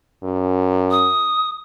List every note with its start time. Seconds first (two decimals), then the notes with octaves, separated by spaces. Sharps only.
0.23 F#2
0.91 D#6